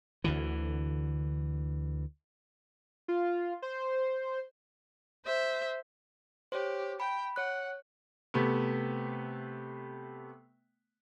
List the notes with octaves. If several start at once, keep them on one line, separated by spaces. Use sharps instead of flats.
D2 D3 E3
F4
C5
C5 E5
G4 C5 C#5
G5 B5
C#5 F#5 F#6
C3 A3 B3